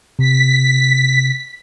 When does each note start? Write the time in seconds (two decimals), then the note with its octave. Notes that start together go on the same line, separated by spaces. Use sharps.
0.19 C3 B6